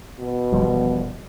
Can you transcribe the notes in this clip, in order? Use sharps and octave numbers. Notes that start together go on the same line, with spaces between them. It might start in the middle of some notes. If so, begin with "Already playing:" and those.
B2
E1 F3 G3